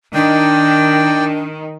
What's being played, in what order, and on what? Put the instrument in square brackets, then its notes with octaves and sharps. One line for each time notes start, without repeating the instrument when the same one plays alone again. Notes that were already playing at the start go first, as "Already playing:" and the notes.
[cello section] D#3 [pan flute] D4 [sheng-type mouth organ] D5 G5